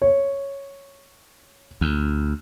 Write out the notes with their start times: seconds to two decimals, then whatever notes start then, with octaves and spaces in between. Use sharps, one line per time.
0.02 C#5
1.81 D2